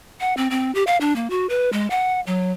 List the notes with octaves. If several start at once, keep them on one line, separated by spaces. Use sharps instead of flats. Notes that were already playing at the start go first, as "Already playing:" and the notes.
F#5
C4
C4
G4
F5
D4
A#3
F#4
B4
G#3
F#5
F#3